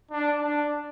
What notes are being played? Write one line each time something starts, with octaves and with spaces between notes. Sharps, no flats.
D4
D4